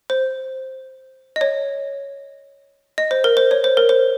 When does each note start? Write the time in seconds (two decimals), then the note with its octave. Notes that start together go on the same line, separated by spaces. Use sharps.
0.10 C5
1.36 D#5
1.41 C#5
2.98 D#5
3.11 C5
3.24 A#4
3.37 C5
3.51 C#5
3.64 C5
3.77 A#4
3.89 C5